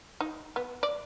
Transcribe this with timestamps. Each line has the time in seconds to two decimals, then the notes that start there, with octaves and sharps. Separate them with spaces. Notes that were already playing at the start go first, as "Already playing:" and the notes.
0.21 D#4
0.56 B3
0.83 D5